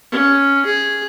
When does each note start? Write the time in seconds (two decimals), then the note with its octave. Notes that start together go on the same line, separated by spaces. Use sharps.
0.12 C#4
0.66 G#4